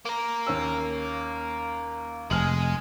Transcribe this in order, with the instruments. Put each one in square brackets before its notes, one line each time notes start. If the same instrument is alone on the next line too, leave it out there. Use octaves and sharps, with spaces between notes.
[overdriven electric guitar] A#3 A#4
[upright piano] D#2 C#4 E6
[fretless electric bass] F1 [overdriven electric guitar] G#3 G#4 [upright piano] G#5 F6 F#7